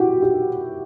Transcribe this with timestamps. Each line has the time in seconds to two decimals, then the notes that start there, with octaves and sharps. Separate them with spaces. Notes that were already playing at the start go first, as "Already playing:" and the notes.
Already playing: E4 F#4 G4
0.22 G4